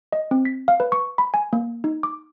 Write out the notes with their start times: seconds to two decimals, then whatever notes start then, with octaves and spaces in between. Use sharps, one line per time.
0.12 D#5
0.31 C4
0.45 B6
0.68 F5
0.80 B4
0.92 C#6
1.18 B5
1.34 G#5
1.53 A#3
1.84 D#4
2.03 D6